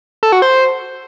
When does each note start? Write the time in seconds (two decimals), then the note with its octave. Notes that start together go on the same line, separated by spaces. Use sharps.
0.23 A4
0.32 F#4
0.42 C5